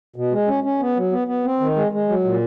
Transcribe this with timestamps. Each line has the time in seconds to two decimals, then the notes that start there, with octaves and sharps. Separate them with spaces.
0.16 B2
0.32 G#3
0.48 C#4
0.64 C#4
0.80 B3
0.96 F#3
1.12 B3
1.28 B3
1.44 C4
1.60 D#3
1.76 G#3
1.92 G#3
2.09 F#3
2.24 A#2